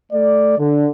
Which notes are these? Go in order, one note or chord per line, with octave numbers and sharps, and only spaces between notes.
A3 D5
D3